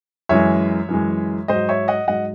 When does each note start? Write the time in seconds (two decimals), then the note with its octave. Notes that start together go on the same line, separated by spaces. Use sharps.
0.29 F#2 E3 G#3 C#5 E5
0.89 F#2 E3 G#3
1.48 G#2 F#3 C5 D#5
1.69 C#5 E5
1.88 D#5 F#5
2.08 G#2 F#3 D#5 F#5